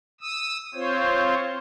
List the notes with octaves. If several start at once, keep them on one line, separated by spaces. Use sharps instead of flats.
D#6 E6
C4 F4 C5 C#5